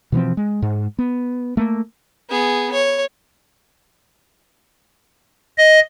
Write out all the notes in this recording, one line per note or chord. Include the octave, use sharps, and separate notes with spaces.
B2 E3 F3 C4
G#3
G#2
B3
A3 A#3
B3 G#4
C#5
D#5